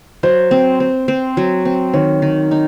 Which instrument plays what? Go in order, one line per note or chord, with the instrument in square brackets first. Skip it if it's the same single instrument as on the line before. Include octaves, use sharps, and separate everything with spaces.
[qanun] F#3 [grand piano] C5
[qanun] C4
C4
C4
F#3
C4
[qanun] D#3 [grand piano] C#5
[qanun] D#3
D#4